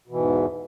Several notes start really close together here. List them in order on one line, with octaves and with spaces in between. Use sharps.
B2 E3 G#2 E2